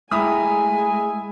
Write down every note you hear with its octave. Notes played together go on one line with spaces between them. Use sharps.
G#3 A3 E4 G5 G#5 A#5 B5 D#6